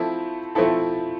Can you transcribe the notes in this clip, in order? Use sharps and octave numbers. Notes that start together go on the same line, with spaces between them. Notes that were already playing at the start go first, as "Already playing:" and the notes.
Already playing: F3 A3 C4 E4 A4
F3 A3 C4 E4 A4